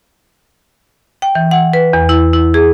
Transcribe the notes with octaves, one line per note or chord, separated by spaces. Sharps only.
G5
E3
F#5
B4
E2
E4
E4
G#4